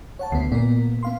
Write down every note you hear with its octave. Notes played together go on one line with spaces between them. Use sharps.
C#5 F#5 A5
D2 B3 C7
A#2 B3 A#4
B3 F5 C6